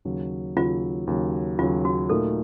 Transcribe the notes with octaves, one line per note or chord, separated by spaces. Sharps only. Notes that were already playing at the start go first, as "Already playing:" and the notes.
D#2 C#3 F#3
D#2 C#3 F#3 F4
D#2 C#3 F#3
D#2 C#3 F#3 F4
F#4
A#2 A3 D#4 A4 A#4